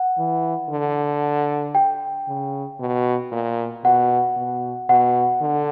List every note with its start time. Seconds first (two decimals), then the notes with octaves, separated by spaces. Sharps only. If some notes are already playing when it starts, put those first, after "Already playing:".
Already playing: F#5
0.18 E3
0.70 D3
1.75 G5
2.28 C#3
2.80 B2
3.32 A#2
3.84 B2 F#5
4.37 B2
4.89 B2 F#5
5.42 D3